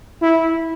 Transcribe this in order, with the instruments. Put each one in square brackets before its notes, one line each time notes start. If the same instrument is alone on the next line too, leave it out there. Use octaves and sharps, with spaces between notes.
[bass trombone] E4